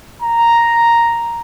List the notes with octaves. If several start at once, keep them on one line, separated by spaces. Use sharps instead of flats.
A#5